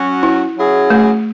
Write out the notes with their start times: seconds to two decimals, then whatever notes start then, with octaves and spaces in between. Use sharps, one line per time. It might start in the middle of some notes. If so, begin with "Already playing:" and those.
Already playing: F#3 C#4 F#4
0.23 E4
0.57 F#3 C#4 E4 G#4
0.90 A3